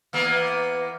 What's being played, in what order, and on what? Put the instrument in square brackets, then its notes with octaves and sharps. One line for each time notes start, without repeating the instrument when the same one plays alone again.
[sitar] E2 A#3 B3